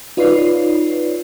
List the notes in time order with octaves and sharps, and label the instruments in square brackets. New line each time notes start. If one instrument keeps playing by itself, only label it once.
[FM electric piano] D#4 F4 B4 C#5 D5 C7